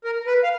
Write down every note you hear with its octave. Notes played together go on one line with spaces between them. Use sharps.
A#4
B4
F5